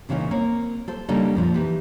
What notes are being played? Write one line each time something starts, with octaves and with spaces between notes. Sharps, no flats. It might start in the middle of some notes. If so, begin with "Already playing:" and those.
A#2 C#3 E3 A#3 C#4 D#4
A#3 C4 C#5
A4 C5
C#3 G3 A#3 D4 D#4 A4
F2 A#2 F3
E3 D#4 G4 B4